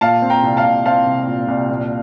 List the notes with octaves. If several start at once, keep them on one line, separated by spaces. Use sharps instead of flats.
A#2 F5 A5
C4
G5 A#5
C2
F5 A5
C2
C4 F5 A5
C2
A#2
C2
A#2